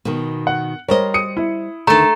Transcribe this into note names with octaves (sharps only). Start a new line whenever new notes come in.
B2 D#3
F#5
G3 A#4 C5 C#5 D#5
D#6 C#7 D#7
E4
D2 D#3 A3 A4 A#5